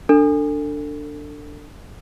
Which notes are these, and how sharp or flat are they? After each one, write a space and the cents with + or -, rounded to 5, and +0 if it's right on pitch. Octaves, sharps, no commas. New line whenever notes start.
D4 +0 A4 +30